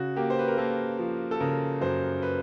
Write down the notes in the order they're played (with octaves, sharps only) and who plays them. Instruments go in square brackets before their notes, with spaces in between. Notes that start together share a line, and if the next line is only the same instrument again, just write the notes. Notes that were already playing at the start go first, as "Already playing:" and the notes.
Already playing: [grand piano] C#3 F#4
A#3 G4
C5
B4
A#4
A#3 A4
F3
A4
C#3 A#4
F#2 C5
B4